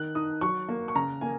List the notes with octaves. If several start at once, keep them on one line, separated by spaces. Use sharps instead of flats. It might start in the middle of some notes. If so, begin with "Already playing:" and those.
Already playing: D#3 F#6
D#4 D#6
F#3 C#6
A#3
C#6
C#3 A#5
A#3 G#5